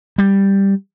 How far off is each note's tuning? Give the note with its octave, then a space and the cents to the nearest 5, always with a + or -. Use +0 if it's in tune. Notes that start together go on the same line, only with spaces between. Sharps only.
G3 +5